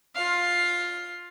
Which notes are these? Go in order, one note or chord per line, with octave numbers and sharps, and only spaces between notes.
F4 F5